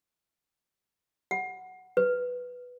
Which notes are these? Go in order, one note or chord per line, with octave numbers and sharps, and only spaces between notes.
F#5
B4